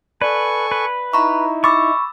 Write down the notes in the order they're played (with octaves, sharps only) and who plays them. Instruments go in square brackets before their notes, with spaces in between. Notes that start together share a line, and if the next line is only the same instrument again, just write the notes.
[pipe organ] A4 G#5 C#6 [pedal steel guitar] B4 [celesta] D5
[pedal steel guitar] B4
[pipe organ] D#4 E4 [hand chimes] A#5 B5 [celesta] C#6
[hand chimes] B5 E6 [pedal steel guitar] C#6 [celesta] D6 A6